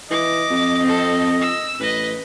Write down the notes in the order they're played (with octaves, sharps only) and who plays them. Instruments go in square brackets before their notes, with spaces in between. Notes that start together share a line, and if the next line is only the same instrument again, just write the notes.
[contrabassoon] E3 [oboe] D#5 [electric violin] D6
[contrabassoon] F2
[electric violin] C4 A4
E6
[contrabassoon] A1 [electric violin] B4 D#5